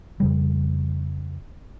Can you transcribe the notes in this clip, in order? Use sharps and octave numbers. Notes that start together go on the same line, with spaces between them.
F2 C#3 G3